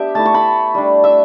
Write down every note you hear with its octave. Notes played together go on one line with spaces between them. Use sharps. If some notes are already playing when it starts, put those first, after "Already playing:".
Already playing: B3 D4 G4 E5
A3 E4 A5
C#6
B5
G3 D4
E5